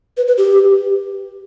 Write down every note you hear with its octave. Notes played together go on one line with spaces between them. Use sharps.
B4
B4
G4